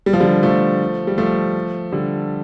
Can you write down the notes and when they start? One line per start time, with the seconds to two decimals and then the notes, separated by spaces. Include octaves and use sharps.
0.06 G3
0.13 F3
0.20 D3 G3
0.43 F3 A3
1.07 G3
1.18 F3 A3
1.92 D3 G3